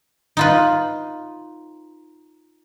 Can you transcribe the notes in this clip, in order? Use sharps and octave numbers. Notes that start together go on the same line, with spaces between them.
D#4 F4 B4